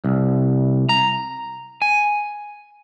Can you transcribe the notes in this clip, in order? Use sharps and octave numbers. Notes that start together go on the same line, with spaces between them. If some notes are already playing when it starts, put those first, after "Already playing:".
C2
A#5
G#5